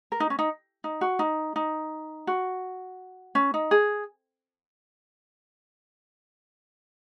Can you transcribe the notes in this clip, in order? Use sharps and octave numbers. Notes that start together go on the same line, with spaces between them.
A#4
D#4
C#4
D#4
D#4
F#4
D#4
D#4
F#4
C#4
D#4
G#4